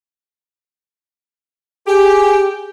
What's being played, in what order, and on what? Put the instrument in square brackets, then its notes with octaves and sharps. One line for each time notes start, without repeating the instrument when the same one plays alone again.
[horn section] G4 [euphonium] G#4